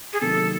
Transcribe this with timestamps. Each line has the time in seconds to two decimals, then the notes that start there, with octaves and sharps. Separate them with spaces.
0.13 G#4
0.21 C3 D#3 F#3 A#3 A4